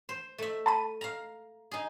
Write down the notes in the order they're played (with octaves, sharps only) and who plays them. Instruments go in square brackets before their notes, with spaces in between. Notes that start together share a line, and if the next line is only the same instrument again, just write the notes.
[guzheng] C5
A3 E5
[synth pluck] A5 B5 D#7
[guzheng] F5 A#5
D#4 G#4